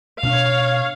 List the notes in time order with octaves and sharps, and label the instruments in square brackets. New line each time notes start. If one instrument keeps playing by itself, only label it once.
[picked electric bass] B2 C#4 D4 [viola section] C#5 F5